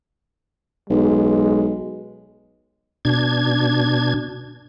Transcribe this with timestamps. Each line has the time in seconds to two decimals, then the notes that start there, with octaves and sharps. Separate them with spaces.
0.90 B1 G#3
3.05 B2 D4 G#6